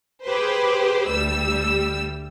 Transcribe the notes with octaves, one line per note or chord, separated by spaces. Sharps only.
G4 G#4 B4 C5
D2 G3 E6